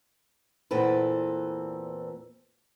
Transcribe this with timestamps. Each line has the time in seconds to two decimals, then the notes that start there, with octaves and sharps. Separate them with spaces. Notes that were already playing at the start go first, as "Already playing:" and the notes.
0.71 E2 A#2 C4 A4 B4